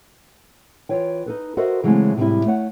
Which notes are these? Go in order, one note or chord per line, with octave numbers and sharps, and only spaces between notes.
E3 F4 C#5 G5
D#4 A4 B4
F#4 A4 A#4 C5 D#5 E5
C#3 E3 F#3 G#3 A3 C4
A2 C3 F3 G3 G#3 E4
A3 C#5 F#5